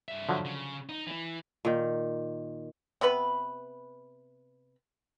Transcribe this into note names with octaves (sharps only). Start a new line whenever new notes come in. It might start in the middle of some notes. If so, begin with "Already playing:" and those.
G2 E5
D3 F3 F#3
C#3
D#4
E3
A#2 D#3
C3 B3 B4 B5